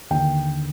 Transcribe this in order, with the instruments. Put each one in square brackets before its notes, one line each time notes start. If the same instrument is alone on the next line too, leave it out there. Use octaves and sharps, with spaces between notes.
[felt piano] D#2 D3 G5